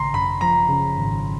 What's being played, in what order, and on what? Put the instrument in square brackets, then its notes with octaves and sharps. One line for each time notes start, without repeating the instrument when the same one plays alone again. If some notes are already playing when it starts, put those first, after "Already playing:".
Already playing: [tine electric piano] G#1 C#3 [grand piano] A#5 C6
[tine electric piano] F#2 [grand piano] B5
[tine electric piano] F3 [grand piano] A#5
[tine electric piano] C#3
G#1